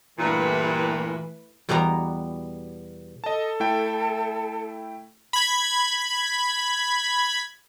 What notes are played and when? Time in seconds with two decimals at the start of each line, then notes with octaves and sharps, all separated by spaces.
0.18 G2 A#2 E3 A3 E4 B4
1.69 E2 B2 G3 B3 D5 A#5
3.24 A4 D#5 A5
3.60 A3 E4 G5
5.33 B5 G#6